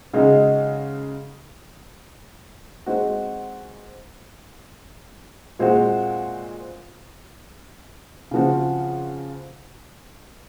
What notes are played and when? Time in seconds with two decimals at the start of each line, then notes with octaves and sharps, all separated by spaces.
0.13 C#3 G#3 D#4 F#4
2.86 G#3 C4 D#4 F#4
5.59 A#2 G#3 C4 F#4
8.31 C#3 F3 C4 F#4